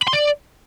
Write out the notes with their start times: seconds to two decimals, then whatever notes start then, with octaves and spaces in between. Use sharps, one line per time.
0.02 B5
0.08 C6
0.13 D5